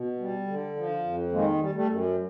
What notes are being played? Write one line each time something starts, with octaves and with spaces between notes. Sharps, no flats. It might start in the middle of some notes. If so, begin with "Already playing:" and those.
Already playing: B2
G3
D3
F3
F2
D#3 G#3 A#3
G3
G3 A3
F#2